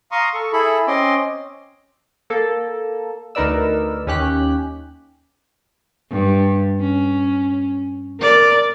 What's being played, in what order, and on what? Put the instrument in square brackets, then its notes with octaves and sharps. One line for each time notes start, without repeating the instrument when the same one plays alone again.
[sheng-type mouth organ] F5 A#5 C6 C#6 D#6
A4 C#6
E4 G#4 A4 B5
C4 C#4 D#5 C6 D6
[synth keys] A#3 A4
D2 D#4 A#4 B4 D5 E6
D#2 C#4 G4 F#6 B6
[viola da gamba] G2
C#4
A#4 D5